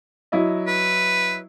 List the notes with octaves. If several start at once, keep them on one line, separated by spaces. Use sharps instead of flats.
F#3 E4 D#5
B4